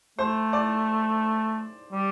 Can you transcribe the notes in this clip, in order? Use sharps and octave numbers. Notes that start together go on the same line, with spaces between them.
A3 C5
D5
G3